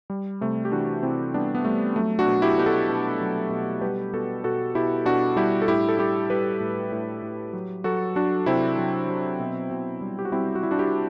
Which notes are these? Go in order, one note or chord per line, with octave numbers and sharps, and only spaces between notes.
G3
C3 A3
G4
E3 D4 F#4
C3 C4 E4
G3 B3 D4
B3
G3 A3
F#3 A3
D4 F#4
B2
E4 G4
B2 G4
F#4 A4
B2
F#3
B2
G3 G4 B4
B2 F#4 A4
B2 F#4 A4
B2 E4 G4
B2 D4 F#4
G3 E4 G4
A4
A2 E4 G4
A4
G3 E4 G4
G3 G4 B4
A2
A2
A2
F#3
F#3 F#4 A4
F#3 D4 F#4
C3 C4 E4
F#3
F#3
B2
B2
G3
G4
F#4
G3 C4 E4
F#4
G3 E4
D4 F#4
E4 G4